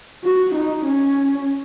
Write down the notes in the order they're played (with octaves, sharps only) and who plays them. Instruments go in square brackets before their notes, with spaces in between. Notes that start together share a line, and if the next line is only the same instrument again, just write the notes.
[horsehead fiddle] F#4
D#4
C#4